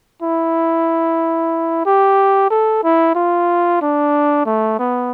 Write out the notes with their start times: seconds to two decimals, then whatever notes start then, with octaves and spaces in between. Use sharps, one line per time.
0.22 E4
1.86 G4
2.50 A4
2.83 E4
3.15 F4
3.82 D4
4.46 A3
4.79 B3